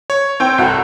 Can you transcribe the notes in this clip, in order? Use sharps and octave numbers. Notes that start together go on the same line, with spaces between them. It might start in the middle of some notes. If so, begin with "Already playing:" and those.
C#5
C4 G5
C2 F#4 A4